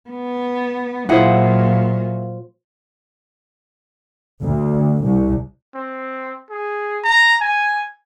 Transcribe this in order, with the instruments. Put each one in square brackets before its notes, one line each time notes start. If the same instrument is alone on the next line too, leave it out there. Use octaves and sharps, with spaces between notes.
[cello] B3
[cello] A#2 F#3 [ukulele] E4 G#4 F#5 [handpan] F4 C5
[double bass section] D2
C2
[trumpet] C4
G#4
A#5
G#5